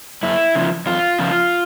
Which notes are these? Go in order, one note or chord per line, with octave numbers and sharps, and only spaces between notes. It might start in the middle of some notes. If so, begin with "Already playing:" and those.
F#2 E4
C#3 F3
F#2 F4
C#3 F3